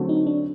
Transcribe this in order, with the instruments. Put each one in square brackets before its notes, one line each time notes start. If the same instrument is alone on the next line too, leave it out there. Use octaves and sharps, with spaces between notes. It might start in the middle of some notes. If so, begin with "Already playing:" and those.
Already playing: [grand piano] D3 F#3 A3 C4 F#4
[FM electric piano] D#4
D4